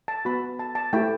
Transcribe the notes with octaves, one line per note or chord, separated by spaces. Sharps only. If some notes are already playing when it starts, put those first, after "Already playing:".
A5
B3 F#4 B5
A5
A5
A3 E4 G4 G5